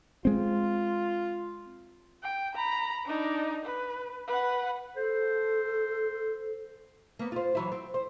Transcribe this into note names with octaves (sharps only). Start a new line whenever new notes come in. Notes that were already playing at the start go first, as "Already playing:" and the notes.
G#3 C4 F4
G5
A#5 B5
D4 D#4
B4
B4 F#5
A4 C5
A#3 B3
F4 C5
E3 F#3 E4
C4
C5